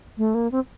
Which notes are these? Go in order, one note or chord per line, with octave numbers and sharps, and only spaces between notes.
A3
A#3
C4